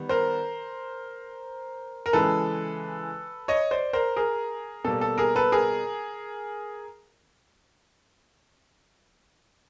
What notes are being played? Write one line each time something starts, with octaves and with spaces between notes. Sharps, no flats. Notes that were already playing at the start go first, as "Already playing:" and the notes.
Already playing: D#3 G3 B3
A#4 C5
A#4
C#3 E3 G#3 A4 B4
C#5 D#5
C5 D5
A#4 C5
G#4 A#4
B2 G3 A#3 A4
A4
G#4 A#4
A4 B4
G#4 A#4